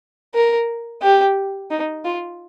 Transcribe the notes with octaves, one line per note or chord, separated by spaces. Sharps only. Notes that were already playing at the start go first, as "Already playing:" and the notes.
A#4
G4
D#4
F4